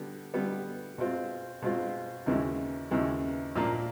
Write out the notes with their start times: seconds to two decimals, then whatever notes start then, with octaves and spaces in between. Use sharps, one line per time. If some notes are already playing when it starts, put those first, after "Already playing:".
Already playing: D3 G3 B3
0.34 D3 G3 B3
0.98 B2 G#3 C4 F4
1.62 B2 G#3 C4 F4
2.26 D#2 C#3 E3 G#3
2.91 D#2 C#3 E3 G#3
3.55 A#2 F3 A#3 D4